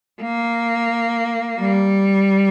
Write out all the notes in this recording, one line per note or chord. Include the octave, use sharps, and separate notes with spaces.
A#3
G3